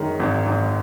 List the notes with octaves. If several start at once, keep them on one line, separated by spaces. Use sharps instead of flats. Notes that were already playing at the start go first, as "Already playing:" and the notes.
Already playing: F#2 D#3 G#3
G#1
G#1